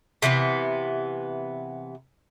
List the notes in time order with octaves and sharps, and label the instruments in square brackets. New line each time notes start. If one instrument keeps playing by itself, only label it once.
[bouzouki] C3 E3 A#3 B3